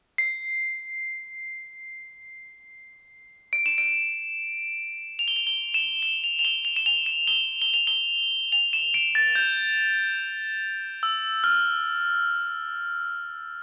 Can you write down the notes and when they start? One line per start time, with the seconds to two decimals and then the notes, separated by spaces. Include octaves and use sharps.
0.18 C7
3.53 D7
3.66 E7
3.78 D7
5.19 F7
5.28 G7
5.36 F7
5.47 G7
5.74 E7
6.03 G7
6.24 F7
6.39 F7
6.45 G7
6.65 F7
6.76 E7
6.86 F7
7.06 E7
7.28 G7
7.62 G7
7.74 F7
7.87 G7
8.52 F7
8.73 E7
8.94 D7
9.15 A6
9.35 G6
11.03 E6
11.44 F6